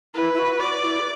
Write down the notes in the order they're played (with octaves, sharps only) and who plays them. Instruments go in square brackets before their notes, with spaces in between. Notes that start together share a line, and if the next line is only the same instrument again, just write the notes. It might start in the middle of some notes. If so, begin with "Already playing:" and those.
[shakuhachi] E4 [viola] B4
[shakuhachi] E4
F#4
[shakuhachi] F#4 [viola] D5
[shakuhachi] E4
B4